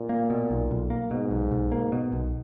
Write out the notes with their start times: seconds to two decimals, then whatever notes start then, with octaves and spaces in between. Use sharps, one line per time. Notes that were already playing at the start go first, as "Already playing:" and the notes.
Already playing: A#2
0.09 A#3
0.30 B2
0.50 B1
0.71 B1
0.90 A#3
1.11 G#2 B2
1.31 B1
1.51 B1
1.72 A#3
1.92 B2
2.12 B1